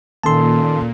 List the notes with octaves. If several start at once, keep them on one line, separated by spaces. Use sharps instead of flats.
A#2 D#3 A#3 C#4 A4 A5 C6